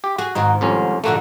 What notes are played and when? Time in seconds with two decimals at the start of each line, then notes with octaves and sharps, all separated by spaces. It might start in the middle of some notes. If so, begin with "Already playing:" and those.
0.04 G4
0.18 F#4 G#4
0.35 G#2 D#3 C4 D#4 F#4
0.61 C2 F2 C#4
1.04 F2 A#2 D3 A3 A#3 F#4